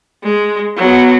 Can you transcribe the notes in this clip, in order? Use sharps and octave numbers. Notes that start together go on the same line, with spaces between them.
G#3
F#3 B3